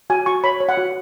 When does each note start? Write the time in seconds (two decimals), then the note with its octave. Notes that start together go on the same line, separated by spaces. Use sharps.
0.10 F#4 G#5
0.26 F#4 C#6
0.44 C#5 B5
0.60 C#5
0.69 F#5
0.77 F#4